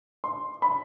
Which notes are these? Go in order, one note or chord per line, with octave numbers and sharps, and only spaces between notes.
C6
B5